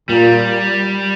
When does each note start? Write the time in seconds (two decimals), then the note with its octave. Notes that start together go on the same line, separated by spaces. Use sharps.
0.09 A#2 G3